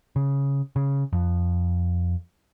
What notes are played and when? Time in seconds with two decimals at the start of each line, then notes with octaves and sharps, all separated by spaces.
0.16 C#3
0.76 C#3
1.13 F2